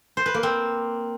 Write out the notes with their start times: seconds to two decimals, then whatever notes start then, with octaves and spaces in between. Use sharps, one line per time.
0.17 C5
0.26 B4
0.34 A#3
0.43 C4